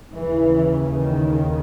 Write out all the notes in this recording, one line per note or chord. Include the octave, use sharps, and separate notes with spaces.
D#2 C#3 E3
D#3